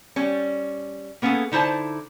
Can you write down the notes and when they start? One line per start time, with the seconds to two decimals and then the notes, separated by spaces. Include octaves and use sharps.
0.16 G3 C#4
1.22 A#3 B3 C#4 G#4 A4
1.52 D3 D#4 E4 C5 A5